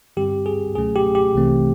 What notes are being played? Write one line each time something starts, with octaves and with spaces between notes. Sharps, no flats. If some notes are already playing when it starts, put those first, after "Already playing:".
G2 D3 G3 C4 G4
G#4
C#2 B2 F#3 A3 C#4 G#4
G4
G4
C2 C3 E3 A3 C4